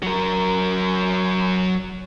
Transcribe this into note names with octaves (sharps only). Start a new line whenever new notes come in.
F#3 A#4